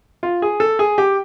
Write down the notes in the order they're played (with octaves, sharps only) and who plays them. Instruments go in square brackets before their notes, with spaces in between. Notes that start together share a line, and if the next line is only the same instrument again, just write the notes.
[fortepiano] F4
G#4
A4
G#4
G4